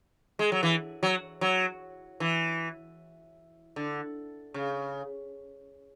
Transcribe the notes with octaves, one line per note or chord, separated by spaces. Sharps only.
G#3
F#3
E3
F#3
F#3
E3
D3
C#3